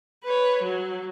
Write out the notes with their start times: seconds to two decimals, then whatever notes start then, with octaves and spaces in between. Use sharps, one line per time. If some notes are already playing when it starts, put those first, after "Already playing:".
0.24 B4 C#5
0.62 F#3